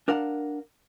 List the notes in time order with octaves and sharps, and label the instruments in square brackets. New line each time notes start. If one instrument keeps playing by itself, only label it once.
[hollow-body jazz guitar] D4 A#4 F5 F#5